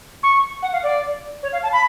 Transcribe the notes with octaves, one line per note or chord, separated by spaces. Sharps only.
C#6
F#5
F5
D5
C#5
F5
A5
B5